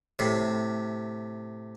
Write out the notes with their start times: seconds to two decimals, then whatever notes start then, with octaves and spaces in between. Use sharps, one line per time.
0.19 A2 C3